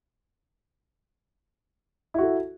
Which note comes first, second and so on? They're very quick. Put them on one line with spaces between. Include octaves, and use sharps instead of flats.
E4 F#4 A4